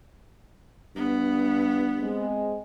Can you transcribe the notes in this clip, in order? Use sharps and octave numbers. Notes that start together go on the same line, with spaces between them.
G2 B3
G#3 C4